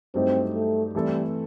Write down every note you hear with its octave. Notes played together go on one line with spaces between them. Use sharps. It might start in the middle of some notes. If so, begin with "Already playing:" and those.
G2 F#3 A3 C4 D#4 G4
A3
E3 G3 A3 C4 E4 A4